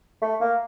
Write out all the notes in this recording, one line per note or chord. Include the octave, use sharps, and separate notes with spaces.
A3
A#3